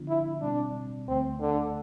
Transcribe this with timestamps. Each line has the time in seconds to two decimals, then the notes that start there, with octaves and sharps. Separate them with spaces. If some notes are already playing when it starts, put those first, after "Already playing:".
Already playing: D3 F3 B3 D4 F4
0.09 E4
0.41 B2 G3 C4 D4
1.08 D2 D3 A3 C4
1.41 D3